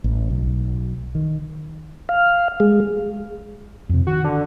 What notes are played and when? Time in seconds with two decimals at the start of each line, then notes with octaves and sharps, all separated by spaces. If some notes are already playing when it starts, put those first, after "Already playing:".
0.04 A1
0.30 B1
1.15 D#3
2.09 F5
2.60 G#3
3.89 F2 C3
4.07 D#3 F#4
4.24 D3